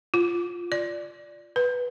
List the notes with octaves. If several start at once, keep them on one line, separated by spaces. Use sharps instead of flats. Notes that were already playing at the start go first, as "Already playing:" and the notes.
F4
D5
B4